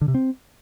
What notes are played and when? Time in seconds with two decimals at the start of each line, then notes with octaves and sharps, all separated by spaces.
0.01 D3
0.08 C3
0.14 C4